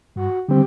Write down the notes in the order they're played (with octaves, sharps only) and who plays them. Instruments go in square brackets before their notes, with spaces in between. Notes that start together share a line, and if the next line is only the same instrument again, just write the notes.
[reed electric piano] G2 [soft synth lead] F#4
[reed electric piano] D3 G3 C4 [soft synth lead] G4